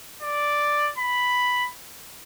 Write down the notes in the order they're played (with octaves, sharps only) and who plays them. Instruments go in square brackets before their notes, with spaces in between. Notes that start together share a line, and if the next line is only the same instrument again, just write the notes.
[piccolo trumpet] D5
B5